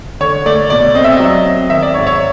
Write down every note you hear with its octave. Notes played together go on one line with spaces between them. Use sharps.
D3 C#5
A3 D5
B2 D5
C4 D#5
E5
D#5
F#3
C4
D#3 E5
D5
G#2 C#5
C#5